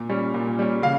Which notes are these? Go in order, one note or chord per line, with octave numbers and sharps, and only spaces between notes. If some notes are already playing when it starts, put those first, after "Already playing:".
Already playing: A#2
G3 C#4
A#2
G3 C#4
C#3 F5